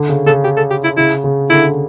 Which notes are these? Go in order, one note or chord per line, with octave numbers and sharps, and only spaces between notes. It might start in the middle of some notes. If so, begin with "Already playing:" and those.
Already playing: D3
C#3
C#3 A4
G4
A4
G4
E4
C#3 E4
C#3
D3 E4